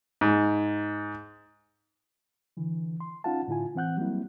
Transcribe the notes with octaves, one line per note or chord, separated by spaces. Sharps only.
G#2
D3 E3
C6
C#4 D#4 F4 F5 F#5 A5
A2 D3 E4 F4 G#5
E3 C4 F#5 F#6 G6
F#3 G3 A#3 C4 E4